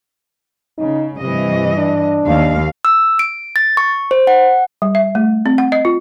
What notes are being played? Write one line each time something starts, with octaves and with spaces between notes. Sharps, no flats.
C#3 D#4
G2 C3 E3 D#5
D4
D#2 F5
E6
D7
A6
C#6
C5
F#5
G3
E5
A3
C4
F#5
D#5
F4